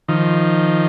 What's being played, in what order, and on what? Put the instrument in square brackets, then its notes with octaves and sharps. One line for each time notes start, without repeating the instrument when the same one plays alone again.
[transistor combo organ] D#3 F3